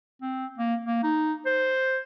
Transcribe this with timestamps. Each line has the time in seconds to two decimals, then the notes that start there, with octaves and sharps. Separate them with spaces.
0.22 C4
0.58 A#3
0.85 A#3
1.03 D#4
1.46 C5